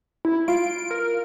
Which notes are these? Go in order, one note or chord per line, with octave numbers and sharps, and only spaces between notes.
E4
F4 D7
A#4